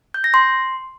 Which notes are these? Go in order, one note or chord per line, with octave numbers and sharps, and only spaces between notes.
G6
A#6
C6